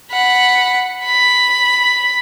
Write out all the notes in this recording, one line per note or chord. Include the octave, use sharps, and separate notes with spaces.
F#5 B5
B5